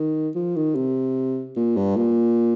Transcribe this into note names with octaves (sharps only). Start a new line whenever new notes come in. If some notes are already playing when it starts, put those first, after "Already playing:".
Already playing: D#3
F3
D#3
C3
A#2
G2
A#2